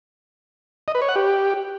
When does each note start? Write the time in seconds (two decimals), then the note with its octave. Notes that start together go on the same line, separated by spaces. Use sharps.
0.88 D#5
0.95 B4
1.02 C#5
1.09 F#5
1.16 G4